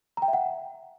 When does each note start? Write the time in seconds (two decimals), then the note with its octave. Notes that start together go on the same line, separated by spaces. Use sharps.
0.17 A#5
0.22 G5
0.28 E5
0.33 F#5